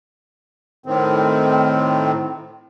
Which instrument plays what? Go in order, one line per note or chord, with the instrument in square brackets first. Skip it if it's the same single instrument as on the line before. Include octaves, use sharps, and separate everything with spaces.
[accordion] A2 D#3 C4